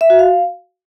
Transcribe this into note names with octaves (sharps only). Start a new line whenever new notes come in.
E5
F#4
F5